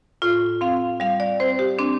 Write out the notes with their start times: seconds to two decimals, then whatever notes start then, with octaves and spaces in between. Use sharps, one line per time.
0.22 A2 F4
0.61 C4 F5
1.00 G3 F5
1.20 D5
1.40 C4 C5
1.59 G4
1.79 C4 D4